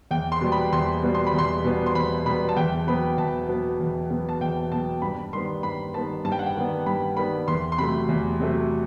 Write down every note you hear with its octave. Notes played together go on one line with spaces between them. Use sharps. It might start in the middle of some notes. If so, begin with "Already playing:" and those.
E2 G5
C6
B2 G3 B3
B5
E2 C6
B2 G3 B3
C6
B5
E2 C6
B2 G3 B3
C6
E2 B5
B2 G3 B3 B5
A5
E2 G5
B2 F#3 B3 B5
E2 A5
B2 F#3 B3
E2
B2 F#3 B3
A5
E2 G5
B2 F#3 B3 A5
G2 B5
D#3 G3 B3 C6
G2 B5
D#3 G3 B3 A5
G2 A5
G5
F#5
G5
D#3 G3 B3
G2 B5
D#3 G3 B3 B5
E2 C6
C6
C3 F#3 A3 B5
E2
C3 F#3 A3